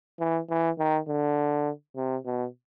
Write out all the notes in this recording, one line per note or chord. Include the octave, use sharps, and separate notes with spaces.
E3
E3
D#3
D3
C3
B2